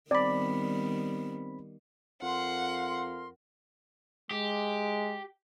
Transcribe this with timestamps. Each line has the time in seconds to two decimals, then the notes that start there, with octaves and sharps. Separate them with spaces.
0.11 D#3 G3 B3 C4 D5 B5
2.22 F2 A#4 F5 F#5 C6
4.31 G#3 G4